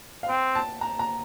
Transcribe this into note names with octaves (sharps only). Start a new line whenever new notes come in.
F5
C4 G5
A5
A#5
A#5